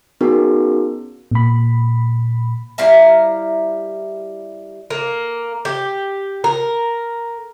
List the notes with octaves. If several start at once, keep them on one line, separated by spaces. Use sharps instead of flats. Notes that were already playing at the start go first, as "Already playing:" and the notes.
B3 C#4 D#4 F#4 G#4 A#4
A#2 B5
G3 E4 F5 A#5
A#3
G4
A#4